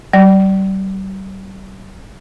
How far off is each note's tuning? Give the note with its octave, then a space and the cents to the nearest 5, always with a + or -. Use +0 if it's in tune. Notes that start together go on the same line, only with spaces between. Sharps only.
G3 -35 D5 +0